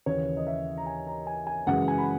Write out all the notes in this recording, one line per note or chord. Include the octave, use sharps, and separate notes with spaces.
D#2 C#3 E3 C#5
D#5
E5
A#5
G#5
A#5
G#5
G#5
F#2 C#3 E3 G#3 F#5
G#5
B5